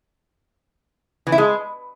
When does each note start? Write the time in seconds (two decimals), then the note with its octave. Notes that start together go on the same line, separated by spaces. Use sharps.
1.27 E3
1.32 E4
1.38 G#3